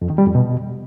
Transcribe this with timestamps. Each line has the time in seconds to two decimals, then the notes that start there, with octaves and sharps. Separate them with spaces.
0.02 F2
0.10 D#3
0.18 G3
0.26 F2
0.35 B2